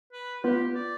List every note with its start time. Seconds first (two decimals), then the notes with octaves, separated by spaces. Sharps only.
0.13 B4
0.43 B3 F4 G4 B4
0.76 D5